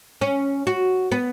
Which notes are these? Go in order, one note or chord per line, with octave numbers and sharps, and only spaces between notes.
C#4
F#4
B3